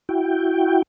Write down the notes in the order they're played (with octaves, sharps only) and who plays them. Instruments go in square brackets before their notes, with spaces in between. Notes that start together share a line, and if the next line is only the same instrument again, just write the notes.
[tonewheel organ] E4 F#4 G5